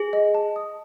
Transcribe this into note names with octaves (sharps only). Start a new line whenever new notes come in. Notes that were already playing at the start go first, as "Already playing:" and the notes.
Already playing: G#4
D#5
A5
D#6